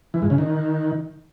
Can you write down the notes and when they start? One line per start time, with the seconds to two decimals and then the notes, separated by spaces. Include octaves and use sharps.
0.14 E3
0.22 G#2
0.30 C#3
0.38 D#3